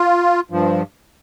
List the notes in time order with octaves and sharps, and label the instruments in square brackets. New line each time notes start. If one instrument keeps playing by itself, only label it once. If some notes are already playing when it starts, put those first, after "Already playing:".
Already playing: [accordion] F4
G2 F3